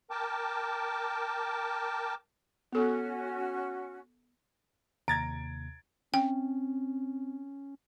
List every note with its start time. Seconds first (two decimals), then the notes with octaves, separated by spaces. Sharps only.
0.10 A#4 G5 A5 D6
2.73 B3 C#4 F#4 A4
5.08 D#2 C3 A#5 G#6 A6 D7
6.14 C4 C#4 G5